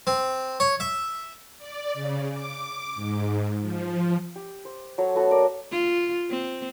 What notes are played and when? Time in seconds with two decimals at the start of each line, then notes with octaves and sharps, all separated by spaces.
0.07 C4
0.60 C#5
0.80 E5
1.58 D5
1.94 C#3
2.29 D6
2.95 G#2
3.60 F3
4.36 G4
4.65 C5
4.98 F#3 A4 C#5
5.15 A3 B3 F#4 A4
5.31 A#4 D5
5.72 F4
6.30 C4